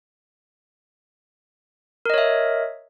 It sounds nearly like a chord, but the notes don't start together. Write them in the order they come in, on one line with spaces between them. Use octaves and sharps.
A#4 D#5 C#5 E5